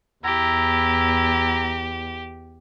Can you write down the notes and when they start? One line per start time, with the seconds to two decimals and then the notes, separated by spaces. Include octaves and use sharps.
0.24 E2 E4 G4 A#5